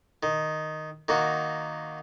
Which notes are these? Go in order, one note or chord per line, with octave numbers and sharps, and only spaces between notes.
D#3
D#3 A#3 F#4